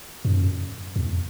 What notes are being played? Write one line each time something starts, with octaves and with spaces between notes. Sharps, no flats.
F#2
E2